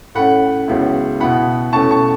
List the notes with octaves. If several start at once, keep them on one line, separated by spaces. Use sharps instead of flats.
A2 A3 C#4 F#5 B5
C#2 C#3 F#3 B3 E4
B2 B3 E4 F#5 B5
B2 A3 C#4 E4 A5 C#6
A5 C#6